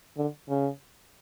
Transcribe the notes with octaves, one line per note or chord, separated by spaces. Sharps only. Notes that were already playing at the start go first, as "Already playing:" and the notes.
D3
C#3